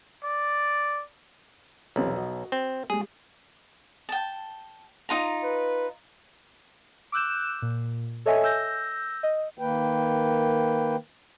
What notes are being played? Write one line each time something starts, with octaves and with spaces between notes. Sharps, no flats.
D5
B1 E2 C3 F3
F#4 D#5
C4
G3 G#3 G#4
G5 A5
D#4 F4 A#5
B4
D6 E6 F#6 G6 E7
A#2
A4 C#5 D#5 E5 G#5
E6 G6 A#6
D#5
D#3 A#3 B4 G5